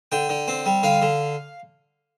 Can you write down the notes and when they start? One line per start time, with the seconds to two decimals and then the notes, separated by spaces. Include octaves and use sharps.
0.12 D3 G5
0.29 D3
0.48 C4
0.66 G3
0.83 D3 F5
1.02 D3